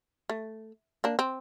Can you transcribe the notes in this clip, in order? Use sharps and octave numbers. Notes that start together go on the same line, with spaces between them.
A3
A#3 D4
C4